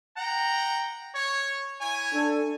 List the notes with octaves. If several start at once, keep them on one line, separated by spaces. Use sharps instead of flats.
F#5 G5 A#5
C#5
E4 C#5 G#5
D4 A4